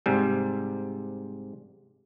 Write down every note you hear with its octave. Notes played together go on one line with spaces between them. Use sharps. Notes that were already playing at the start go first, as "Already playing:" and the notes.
G#2 C3 G3